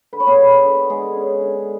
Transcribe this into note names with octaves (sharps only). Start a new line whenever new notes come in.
D3 B4
C#5
B3 B4
G#3
D3
D3 G#3 G#4
C#4
D3